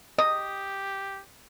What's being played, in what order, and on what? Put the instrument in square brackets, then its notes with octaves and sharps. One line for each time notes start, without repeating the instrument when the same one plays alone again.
[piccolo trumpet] G4 [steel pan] D#5 [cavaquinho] D#6